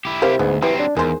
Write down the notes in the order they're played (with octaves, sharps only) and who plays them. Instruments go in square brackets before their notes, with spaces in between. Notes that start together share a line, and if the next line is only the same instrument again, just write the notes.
[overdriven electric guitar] E4 G4
[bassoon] C3 [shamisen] A#4 C5 F5
[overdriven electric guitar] D2 [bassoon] G#2 [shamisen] B3
[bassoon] E3 [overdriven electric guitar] F#3 C4 [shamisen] G3
[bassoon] D4
[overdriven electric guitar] E2 [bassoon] D#3 [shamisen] G#3 C5